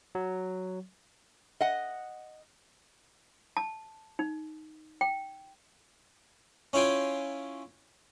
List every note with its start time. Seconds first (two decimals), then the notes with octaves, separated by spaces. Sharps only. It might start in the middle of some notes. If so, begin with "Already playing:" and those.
0.15 F#3
1.61 D#5 F#5
3.57 A5
4.19 D#4
5.01 G5
6.73 C#4 E4 F4 G5 G#5